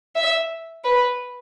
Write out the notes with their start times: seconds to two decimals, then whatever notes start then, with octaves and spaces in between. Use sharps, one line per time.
0.15 E5
0.84 B4